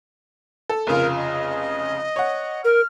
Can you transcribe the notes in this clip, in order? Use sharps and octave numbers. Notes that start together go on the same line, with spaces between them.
A4
F1 C#3 F4 A#4
D#5
C#5 F#5
A#4 F6